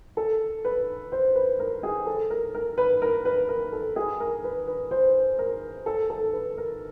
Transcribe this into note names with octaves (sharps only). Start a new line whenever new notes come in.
A4
B4
C5
B4
A#4
G#4
A4
A#4
A#4
B4
A#4
B4
A#4
A4
G#4
A#4
B4
B4
C5
A#4
A4
A4
B4
A#4